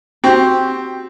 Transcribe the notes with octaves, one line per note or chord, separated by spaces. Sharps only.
C4 F#4 G4